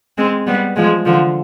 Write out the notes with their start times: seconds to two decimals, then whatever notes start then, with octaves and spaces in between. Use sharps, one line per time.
0.18 G#3 C4
0.47 G3 B3
0.76 F3 G#3
1.05 D3 F3